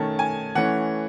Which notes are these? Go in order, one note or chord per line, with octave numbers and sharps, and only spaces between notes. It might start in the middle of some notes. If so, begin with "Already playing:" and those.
Already playing: D#3 A3 C#4 A5
G#5
E3 A3 C#4 F#5